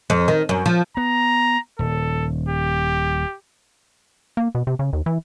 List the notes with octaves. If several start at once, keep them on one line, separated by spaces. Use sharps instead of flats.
F2
D#3
F#2
F3
B3 A#5
D#1 A4
G4
A#3
B2
C3
C#3
D#2
E3